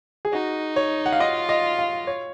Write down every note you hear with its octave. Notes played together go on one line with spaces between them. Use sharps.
G#4
D#4 F#4
C#5
F#5
F5
F4 D#5
D#5
F5
C#5